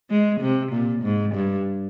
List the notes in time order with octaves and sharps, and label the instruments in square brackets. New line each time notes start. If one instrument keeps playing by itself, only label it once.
[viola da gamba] G#3
C3
A#2
G#2
G2